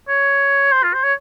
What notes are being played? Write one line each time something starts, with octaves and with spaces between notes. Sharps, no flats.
C#5
C5
F4
C5
C#5